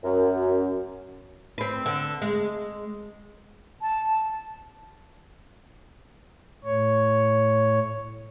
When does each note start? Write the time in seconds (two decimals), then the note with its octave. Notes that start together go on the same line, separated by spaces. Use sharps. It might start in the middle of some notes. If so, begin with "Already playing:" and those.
0.04 F#2
1.58 C4 B4
1.86 D3
2.22 G#3
3.82 A5
6.65 A2 C#5